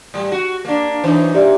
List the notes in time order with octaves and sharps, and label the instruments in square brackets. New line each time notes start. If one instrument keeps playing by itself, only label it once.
[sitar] A2 G3
F#4
A#3 D4
[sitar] E3 F#3 D#4 [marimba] D4 C5
[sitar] A#2 [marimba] G4 D5 E5